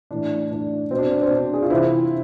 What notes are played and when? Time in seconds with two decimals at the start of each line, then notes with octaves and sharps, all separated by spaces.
0.11 A2 E3 D4
0.51 A2 E3 D4
0.91 B2 C4
0.98 D4
1.06 C4
1.14 D4
1.22 C4
1.30 B2 D4
1.54 G#4
1.63 F4
1.70 C3 E3 C4 E4